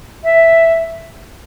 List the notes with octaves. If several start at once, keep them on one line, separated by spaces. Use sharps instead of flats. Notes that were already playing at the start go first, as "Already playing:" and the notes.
E5